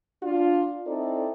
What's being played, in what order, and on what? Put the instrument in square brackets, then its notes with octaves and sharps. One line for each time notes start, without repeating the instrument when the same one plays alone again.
[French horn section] D4 F4
C4 D#4 E4 A4 D5